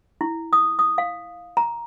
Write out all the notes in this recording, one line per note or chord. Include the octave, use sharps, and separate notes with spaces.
E4
D#6
D#6
F5
A#5